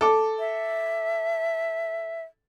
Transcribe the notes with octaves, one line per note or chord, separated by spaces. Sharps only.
A4 D6
E5